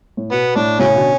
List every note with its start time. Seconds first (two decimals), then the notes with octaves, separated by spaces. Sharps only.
0.17 A2
0.31 B2 B3
0.55 A2 D4
0.79 A2 C#3 F#3 C#4
0.96 B2 D3